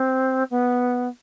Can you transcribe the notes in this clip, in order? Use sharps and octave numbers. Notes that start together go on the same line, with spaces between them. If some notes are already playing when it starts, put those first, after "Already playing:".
Already playing: C4
B3